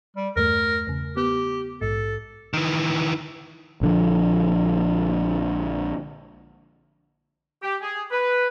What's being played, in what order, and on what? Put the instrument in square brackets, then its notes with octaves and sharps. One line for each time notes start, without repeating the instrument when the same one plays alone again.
[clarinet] G3
[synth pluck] E2 G2 A3 [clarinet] A#4
[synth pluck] E2 C#3
[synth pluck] B3 [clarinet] G4
[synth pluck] A#1 G#2 [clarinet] A4
[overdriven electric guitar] D#3 E3
[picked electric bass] A#1 D3 F3
[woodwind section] G4
G#4
B4